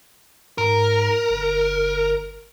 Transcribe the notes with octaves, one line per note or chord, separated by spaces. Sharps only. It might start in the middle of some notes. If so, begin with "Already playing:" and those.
G#2 A#4
G1